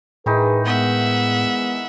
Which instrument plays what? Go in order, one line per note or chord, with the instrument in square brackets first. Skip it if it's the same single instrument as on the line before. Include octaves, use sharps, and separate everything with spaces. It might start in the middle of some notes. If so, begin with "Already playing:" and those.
[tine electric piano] A2 [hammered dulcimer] D#3 E3 D#4 [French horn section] G#4 B4
[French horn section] G#3 B3 [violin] E5 F#5